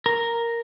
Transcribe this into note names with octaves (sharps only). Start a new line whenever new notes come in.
A#4